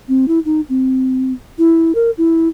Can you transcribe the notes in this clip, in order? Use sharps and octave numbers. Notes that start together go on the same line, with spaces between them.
C4
E4
D#4
C4
E4
A#4
E4